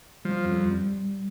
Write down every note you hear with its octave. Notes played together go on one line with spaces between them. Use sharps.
F3 G3
F2
G3